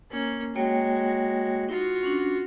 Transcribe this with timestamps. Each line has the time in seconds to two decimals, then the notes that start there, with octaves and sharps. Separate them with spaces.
0.11 A#3 C#4
0.55 G#3 A#3 F#4 C#5 G5
1.69 D#4 F4 F#4
2.03 C#4 D4